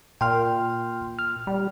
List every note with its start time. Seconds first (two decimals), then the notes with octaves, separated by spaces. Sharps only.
0.21 A#2 G5 C6 F6
1.19 F6
1.47 G3